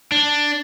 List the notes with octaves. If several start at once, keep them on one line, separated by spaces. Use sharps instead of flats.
D4